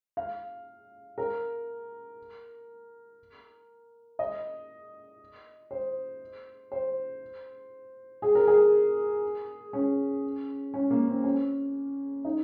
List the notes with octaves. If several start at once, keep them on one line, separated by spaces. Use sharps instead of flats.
F5
A#4
D#5
C5
C5
G#4
A#4
G#4
C#4
C#4
A#3
C4
C#4
D#4